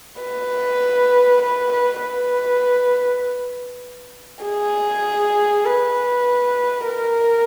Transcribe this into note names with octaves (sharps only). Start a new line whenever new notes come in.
B4
B4
B4
B4
G#4
B4
A#4